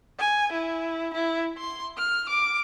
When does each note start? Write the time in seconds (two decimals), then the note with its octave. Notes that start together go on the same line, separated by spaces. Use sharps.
0.19 G#5
0.52 E4
1.13 E4
1.58 C6
1.97 F6
2.29 D6